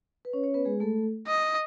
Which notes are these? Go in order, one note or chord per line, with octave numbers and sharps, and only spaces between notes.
B4
C#4 C#5
C#4 C#5
B3 B4
G#3 G#4
A3 A4
D#5